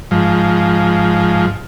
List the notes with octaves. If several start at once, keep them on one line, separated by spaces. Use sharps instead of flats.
G#2 F3